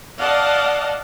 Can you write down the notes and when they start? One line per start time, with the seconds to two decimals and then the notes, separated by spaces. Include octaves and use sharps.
0.18 D5 D#5 F5 F#5 A5